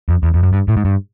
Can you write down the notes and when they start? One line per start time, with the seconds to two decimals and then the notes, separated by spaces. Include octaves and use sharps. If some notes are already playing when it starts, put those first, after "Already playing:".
0.09 F2
0.23 E2
0.34 F2
0.43 F#2
0.53 G2
0.68 A2
0.77 G#2
0.85 G2